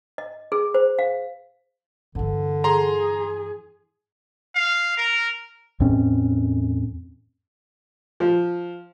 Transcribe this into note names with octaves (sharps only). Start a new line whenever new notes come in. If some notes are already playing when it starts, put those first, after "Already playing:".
D#5
G#4
C5
F5
G2 D3 E3
G#4 A#5 C6
F5
A#4
E2 A2 C4 C#4
F3